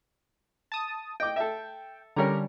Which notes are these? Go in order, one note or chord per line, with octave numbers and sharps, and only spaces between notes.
A5 D#6
D#5 G5 D6
A4 E5
D3 G3 C#4 A#4 C#5 A#5